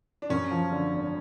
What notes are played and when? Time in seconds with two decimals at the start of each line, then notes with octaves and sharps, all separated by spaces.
0.22 D4
0.30 F#2 C#4
0.51 F3
0.71 D3
0.93 G#1